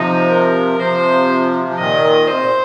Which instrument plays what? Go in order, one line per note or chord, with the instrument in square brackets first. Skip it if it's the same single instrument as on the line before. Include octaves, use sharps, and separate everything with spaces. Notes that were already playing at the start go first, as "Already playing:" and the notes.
Already playing: [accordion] C3 F3 [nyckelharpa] D#4
[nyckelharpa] A#4
[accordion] C3 F3 [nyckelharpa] C5
[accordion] F3
[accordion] A#2 D#3 [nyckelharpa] D#5
[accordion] C3 [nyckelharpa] C5
[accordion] A#2